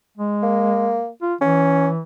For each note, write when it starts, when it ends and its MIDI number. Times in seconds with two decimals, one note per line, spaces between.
0.17 1.00 56
0.43 1.09 58
1.22 1.34 65
1.41 2.02 52
1.41 1.88 61